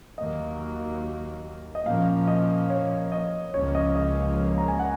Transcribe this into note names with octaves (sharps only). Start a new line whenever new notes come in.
D#2 D#3 F#3 A#3 D#5
D#5
A#2 F3 A#3 C#4 F5
D#5
C#5
D#5
C#2 C#3 F3 A#3 C#4 C#5
D#5
D#5
A#5
G#5
F#5